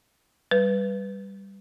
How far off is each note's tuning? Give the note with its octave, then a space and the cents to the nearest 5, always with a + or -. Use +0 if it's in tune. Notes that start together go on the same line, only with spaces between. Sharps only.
G3 +0 B4 +0